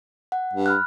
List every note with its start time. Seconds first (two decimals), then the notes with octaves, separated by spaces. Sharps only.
0.32 F#5
0.53 G2
0.66 B5 F6 F#6